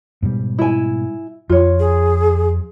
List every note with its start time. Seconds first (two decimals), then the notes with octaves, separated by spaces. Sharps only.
0.22 G#2 B2 G3
0.58 E4 G#5
1.49 F2 F4 C#5
1.80 G#4